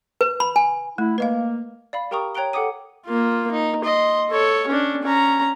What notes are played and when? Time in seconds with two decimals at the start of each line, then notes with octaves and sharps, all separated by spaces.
0.21 B4
0.40 B5
0.56 G#5
0.98 A3 E4
1.18 A#3 B4 D#5 F5
1.93 D5 F5 B5
2.11 G4 A#4 G5 A#5 C#6 D#6
2.35 C#5 G5 A#5 F#6 D7 G7
2.53 A4 F#5 G5 D6 D#6 D#7
3.06 A#3 F4
3.51 D#4
3.84 D#5 C6
4.31 A4 C#5
4.67 C#4 D4
5.02 C#4 A#5